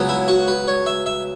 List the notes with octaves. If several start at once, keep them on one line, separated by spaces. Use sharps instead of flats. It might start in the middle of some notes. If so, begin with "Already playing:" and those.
Already playing: C#2 C#3 F#3 B3
E4
F#4
B4
C#5
E5
E5